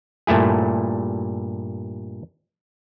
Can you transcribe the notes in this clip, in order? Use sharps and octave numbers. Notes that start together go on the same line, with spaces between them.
G2 A#2 A3 E4 G#4